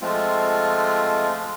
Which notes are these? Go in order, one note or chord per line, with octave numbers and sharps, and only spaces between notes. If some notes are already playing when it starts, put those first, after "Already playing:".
F3 G#3 A3 C4 F4